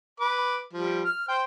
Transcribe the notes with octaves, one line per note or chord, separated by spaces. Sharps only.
B4 D6
F3 G3
F6
C5 G5